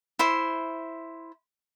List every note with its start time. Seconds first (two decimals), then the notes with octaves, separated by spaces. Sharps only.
0.19 E4 C5